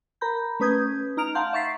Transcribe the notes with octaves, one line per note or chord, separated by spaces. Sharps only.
A#4 A#5 B5 G6
A3 C#4 B4 D#6 G6 G#6
D#4 A#5 F6 D7 F7
F5 F#5 A5 A#5 C6 G6
E5 C#6 A6 B6 C7